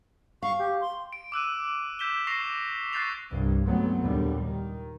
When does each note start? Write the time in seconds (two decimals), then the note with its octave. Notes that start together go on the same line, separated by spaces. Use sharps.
0.43 F5 C#6
0.59 G4
0.81 C6
1.13 D7
1.32 D6 E6 F#6 D#7
1.99 E6 G6 B6 E7 G7
2.27 C#6 A#6 C7 F7
2.93 C#6 F#6 G6 A6 C7 F7
3.31 C2 G2
3.66 C#2 G2 F#3 A3 B3 C4
4.01 D#2 A#2 D3 G3
4.41 D#3